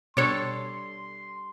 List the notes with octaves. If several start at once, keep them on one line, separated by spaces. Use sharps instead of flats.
B2 G3 D4 A4 C#5 D5 C6